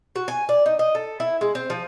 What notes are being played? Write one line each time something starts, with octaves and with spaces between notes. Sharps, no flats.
F#4
G#5
D5
D#4
D#5
A4
E4
G#3
C4
F3